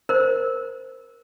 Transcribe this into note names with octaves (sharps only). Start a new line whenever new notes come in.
A#4 C5